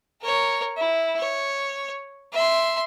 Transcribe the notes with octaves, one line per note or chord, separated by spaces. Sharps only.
A#4 C#5
E4
C#5
E5 C6